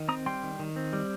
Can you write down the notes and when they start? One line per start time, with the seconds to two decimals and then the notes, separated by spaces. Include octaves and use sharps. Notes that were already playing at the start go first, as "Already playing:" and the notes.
Already playing: D#3
0.08 C4 A#5 D#6
0.26 G3 G5 C6
0.43 D#3
0.59 D#3
0.76 C4
0.93 G3